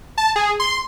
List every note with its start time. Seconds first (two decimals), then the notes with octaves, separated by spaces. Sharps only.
0.18 A5
0.36 G#4
0.60 C6